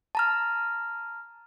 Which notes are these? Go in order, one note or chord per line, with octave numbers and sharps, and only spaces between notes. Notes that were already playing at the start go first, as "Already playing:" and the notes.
A5 A#5 F6